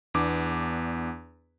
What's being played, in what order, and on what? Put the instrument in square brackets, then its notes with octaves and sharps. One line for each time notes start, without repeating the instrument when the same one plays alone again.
[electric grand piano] E2 B3 D4 D6